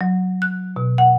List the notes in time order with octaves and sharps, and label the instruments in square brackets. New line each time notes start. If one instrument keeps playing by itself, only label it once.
[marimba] F#3
F#6
B2
F#5